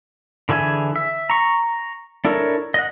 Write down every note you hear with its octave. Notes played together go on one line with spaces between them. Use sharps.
D3 E3 G#4 E5 G#5
E5
A#5 C#6
D4 E4 A4 A#4 C#5
D#5 F#5